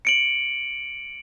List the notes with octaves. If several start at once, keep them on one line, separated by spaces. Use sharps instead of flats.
C#7 D7 F#7